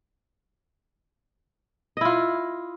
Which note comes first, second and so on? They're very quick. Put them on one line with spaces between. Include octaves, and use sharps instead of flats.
D#5 E4 F4